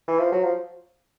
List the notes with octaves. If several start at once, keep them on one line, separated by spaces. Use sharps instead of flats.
E3
F3
F#3
F3